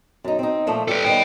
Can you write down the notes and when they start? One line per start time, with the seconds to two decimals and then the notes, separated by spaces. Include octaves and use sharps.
0.24 F#2 D#4
0.39 C4 D#4
0.67 A#2 F3 A3
0.88 G3 G4 A4 B4
1.05 D#3 G3 B3 C#5 G5